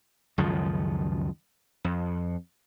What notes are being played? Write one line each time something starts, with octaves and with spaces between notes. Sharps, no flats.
C#2 F#2 D#3 F3
F2